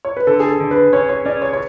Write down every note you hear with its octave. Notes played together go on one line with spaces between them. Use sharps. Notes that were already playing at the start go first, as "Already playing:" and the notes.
C#5
B4
D3 A4
G#4
A4
D3
B4
C#4 C#5
C#5
C#4 D5
C#5
C#5